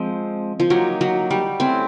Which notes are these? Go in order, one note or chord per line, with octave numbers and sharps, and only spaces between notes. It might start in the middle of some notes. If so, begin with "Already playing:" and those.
Already playing: F3 G#3 C4
F3
F#3 A#3 D#4 G4 A#4 C#5
F#3
G3
A3 C4 C#4 E4